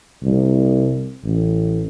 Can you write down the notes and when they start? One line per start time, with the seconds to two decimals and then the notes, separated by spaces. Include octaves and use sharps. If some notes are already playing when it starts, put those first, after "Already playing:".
0.24 C2
1.23 A1